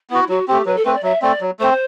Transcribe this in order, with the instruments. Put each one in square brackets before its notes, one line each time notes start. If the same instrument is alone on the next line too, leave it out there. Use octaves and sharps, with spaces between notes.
[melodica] B3 F#4 [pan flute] E4
[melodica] F#3 [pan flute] F#4
[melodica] A3 C4 [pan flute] G4
[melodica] F#3 [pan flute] B4
[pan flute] A4
[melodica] A3 C4 [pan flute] B4
[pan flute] D5
[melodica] F#3 [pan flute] E5
[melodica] A3 C4 [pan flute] D5
[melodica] F#3
[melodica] A3 C4 [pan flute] C5